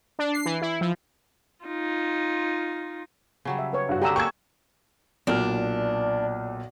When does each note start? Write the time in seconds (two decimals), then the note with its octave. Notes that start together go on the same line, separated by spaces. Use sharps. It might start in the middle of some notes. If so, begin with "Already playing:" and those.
0.19 D4
0.34 C7
0.45 E3
0.62 E4
0.81 F3
1.65 D#4 F4
3.45 C#3 F#3 G3
3.59 E5
3.73 B4 C#5
3.89 G2 F#4
4.02 D3 G#3 G4 D#5 A#5 E6
4.16 A#3 C#4 D4 G5 C#6 E6 G#6
5.27 B1 A#2 D4 F6